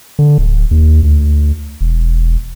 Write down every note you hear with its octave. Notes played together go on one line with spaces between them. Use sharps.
D3
D1
D#2
D2
E1